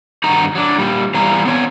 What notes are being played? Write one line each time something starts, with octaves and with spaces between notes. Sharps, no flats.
G2 D#3 D#4 F#4 A#5
F#3 D4
A#2 G3
B2 E3 G3 F5 A#5
B3 C4 C#5